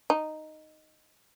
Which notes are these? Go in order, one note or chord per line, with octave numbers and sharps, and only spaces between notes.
D#4